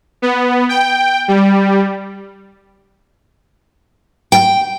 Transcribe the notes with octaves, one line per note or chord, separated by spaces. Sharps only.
B3
G5
G3
G5